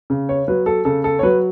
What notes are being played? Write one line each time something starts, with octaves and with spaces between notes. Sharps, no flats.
C#3
C#5
F#3 B4
A4
C#3 A4
A4
C#5
F#3 B4